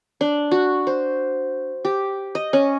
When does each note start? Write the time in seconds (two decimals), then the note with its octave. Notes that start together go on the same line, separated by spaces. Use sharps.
0.21 D4
0.51 F#4
0.87 C5
1.85 G4
2.35 D#5
2.53 C#4